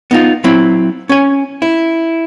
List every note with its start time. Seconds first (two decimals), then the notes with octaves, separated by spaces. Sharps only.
0.11 B3 D#4 F4
0.44 F#3 C4 E4
1.09 C#4 G#5
1.62 E4